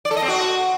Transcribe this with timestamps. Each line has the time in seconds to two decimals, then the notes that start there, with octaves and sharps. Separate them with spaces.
0.05 D5
0.11 A4
0.17 D#5
0.22 C4
0.28 F#4